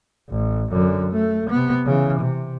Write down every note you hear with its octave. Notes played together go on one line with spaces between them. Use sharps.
A1
F#2 D3
A3
C3 B3
C#3 E3
C3